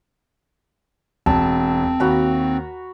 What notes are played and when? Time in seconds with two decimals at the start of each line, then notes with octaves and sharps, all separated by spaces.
1.26 E1 C4 A5
2.00 D#2 F#4 A#5 B5